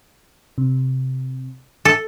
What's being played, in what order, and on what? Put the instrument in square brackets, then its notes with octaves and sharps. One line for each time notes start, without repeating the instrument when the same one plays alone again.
[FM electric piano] C3
[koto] A4